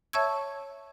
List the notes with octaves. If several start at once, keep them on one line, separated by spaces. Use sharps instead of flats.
C#5 E5 A5 C#6 E6 G#6